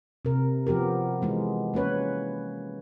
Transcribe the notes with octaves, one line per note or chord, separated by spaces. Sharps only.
C3 A#4
F3 B3 G4 A#4
E3 G#3 B3
A#3 C#4 B4 C#5